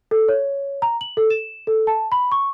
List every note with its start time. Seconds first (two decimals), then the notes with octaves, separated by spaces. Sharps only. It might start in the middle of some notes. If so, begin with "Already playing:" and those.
0.11 A4
0.28 C#5
0.82 A#5
1.01 F#7
1.17 A4
1.30 E7
1.67 A4
1.87 A5
2.12 B5
2.32 C#6